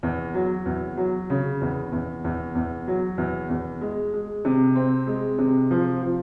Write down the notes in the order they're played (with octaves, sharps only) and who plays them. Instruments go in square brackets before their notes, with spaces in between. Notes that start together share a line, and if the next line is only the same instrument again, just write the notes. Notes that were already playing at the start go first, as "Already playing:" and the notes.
[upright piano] E2
F#3
E2
F#3
C#3
E2
E2
E2
E2
F#3
E2
E2
G#3
G#3
C3
C4
G#3
C3
F3
F3